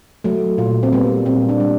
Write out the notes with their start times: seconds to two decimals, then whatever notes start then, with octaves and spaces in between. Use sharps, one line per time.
0.24 F#3 A3
0.58 A#2 F4
0.83 C4
0.93 G3 A#3 B3
1.25 A#2 C4
1.49 D4
1.60 G3 A#3